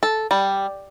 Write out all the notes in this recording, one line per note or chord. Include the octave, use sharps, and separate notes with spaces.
A4
G3